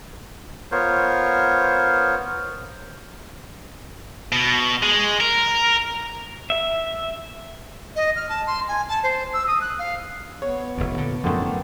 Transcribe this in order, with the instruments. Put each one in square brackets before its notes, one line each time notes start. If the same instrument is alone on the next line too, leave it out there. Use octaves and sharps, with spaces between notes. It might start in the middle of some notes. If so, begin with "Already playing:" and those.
[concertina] B3 F4 A#4 C5 C#5
[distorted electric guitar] B2
G#3
A#4
[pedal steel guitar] E5
[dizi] D#5
F6
A5
C6
G#5
A5
C5
E6
D#6
F#6
F5
[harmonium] B3 [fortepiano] C#5
[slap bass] F1 D#2
A#2 D3
[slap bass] F#2 F3 [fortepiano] D3 D#3 A3